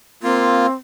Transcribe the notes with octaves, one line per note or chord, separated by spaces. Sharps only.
A#3 C4 F4